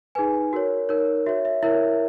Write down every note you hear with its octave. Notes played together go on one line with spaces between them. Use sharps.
D#4 G#4 B4 G#5
F#4 A#4 C#5
D#4 A#4 C#5
F#4 C#5 E5
E5
E4 A#4 C#5 E5